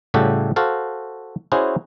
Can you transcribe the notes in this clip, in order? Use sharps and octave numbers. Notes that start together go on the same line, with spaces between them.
A2 C#3 G3 F#4 G4 A4
F#4 A4 C5 F5
C#4 E4 F#4 G#4 C5 D5